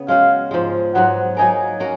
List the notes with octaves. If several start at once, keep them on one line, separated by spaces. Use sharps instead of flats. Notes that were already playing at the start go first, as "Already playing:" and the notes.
Already playing: C#3 B3
G#3 C#4 F#4 F5
G#2 F3 G#3
G#2 F#3 B3 F#5
F#3 A#3 D#4 A#4 G#5
A#3 C#4 F#4 A#4